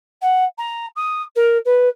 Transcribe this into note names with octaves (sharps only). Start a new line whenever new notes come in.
F#5
A#5
D#6
A#4
B4